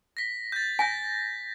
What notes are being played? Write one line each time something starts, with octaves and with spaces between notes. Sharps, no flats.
A#6 B6
G6 A6
G#5 G6 A#6 B6